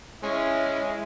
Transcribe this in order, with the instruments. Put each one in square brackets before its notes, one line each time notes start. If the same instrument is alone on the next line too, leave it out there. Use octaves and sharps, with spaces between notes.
[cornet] G#3 [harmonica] C#4 [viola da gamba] E4